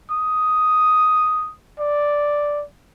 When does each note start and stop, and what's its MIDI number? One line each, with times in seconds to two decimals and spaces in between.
0.10 1.51 87
1.79 2.63 74